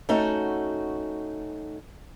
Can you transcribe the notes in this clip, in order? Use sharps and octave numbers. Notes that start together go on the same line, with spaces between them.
A3 C#4 D#4 F#4